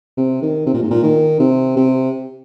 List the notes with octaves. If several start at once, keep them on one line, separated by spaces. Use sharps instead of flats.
C3
D#3
C3
A#2
G#2
A#2
D#3
C3
C3